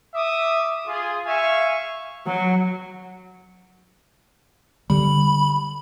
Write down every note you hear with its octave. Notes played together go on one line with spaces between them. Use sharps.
E5 D6 D#6
F4 G#4
E5 F5 G#5 C#6
F#3
D3 G3 B5